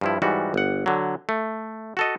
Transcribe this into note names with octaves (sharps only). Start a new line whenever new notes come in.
G2 F3 E4
G#2 E3 G3 F#4
G1 F#5
D3 F#3
A3
F#4 A4 D#5